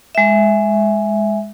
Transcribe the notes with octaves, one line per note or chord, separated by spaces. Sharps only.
G#3 E5